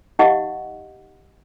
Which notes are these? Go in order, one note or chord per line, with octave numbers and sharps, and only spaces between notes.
D#4 G4 D#5 F5 F#5 C#6